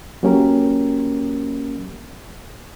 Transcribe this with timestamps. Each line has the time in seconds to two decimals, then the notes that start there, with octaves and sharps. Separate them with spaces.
0.23 F#3 A#3 C#4 G4 A#4